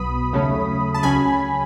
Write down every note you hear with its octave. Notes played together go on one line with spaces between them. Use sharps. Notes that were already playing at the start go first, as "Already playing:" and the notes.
Already playing: B1 B2 F#3 B3 B5 D#6
D#2 C#3 F#3 A3 C#4
A5
C#2 C#3 F#3 C#4 G#5 B5